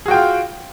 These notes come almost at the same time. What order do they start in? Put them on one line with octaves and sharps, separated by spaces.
G#4 F#4 G5 F4